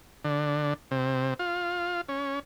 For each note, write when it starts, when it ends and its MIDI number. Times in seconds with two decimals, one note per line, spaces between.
0.24 0.74 50
0.91 1.34 48
1.39 2.01 65
2.09 2.40 61